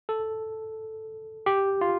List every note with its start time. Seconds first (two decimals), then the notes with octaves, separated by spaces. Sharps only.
0.09 A4
1.46 G4
1.81 F4